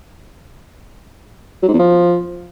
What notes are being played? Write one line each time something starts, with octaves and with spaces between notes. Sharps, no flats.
F#3
G#2
E2
F3